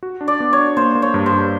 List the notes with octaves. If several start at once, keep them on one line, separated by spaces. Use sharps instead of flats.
F#4
D4
D5
B3
C#5
D4
A#3 C5
A#3
C#5
G2
C5
G2